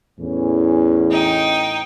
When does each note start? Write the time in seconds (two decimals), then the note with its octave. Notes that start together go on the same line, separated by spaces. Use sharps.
0.19 E2 A2 E3 C#4
1.11 D#4 G5